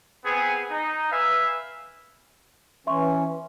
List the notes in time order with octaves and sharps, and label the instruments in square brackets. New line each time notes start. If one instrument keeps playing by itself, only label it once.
[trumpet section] B3 C4 G#4
D#4
B4 E5 F5 G#5
[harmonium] E3 C#4 [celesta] E5 C6 C#6